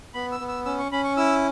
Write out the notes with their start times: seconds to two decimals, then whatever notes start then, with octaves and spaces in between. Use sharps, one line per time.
0.14 B3 B5
0.32 E6
0.40 B3
0.48 E6
0.65 C#4 E6
0.79 C#6
0.92 C#4 B5
1.04 C#6
1.17 E4 E6